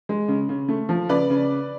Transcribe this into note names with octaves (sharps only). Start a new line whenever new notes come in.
G#3
C#3
C#3
A3
F3
C#3 B4 D5
C#3